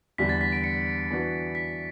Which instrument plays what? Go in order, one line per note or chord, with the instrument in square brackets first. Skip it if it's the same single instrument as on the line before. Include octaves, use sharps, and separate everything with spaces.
[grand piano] E2 D3 G3 [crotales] B6
[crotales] A6
B6
D7
C#7
[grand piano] E3 B3 D4 F#4
[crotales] B6